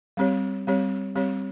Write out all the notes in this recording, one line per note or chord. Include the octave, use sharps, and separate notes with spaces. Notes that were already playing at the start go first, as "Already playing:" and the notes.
G3 C4 G4 C#5
G3 C4 G4 C#5
G3 C4 G4 C#5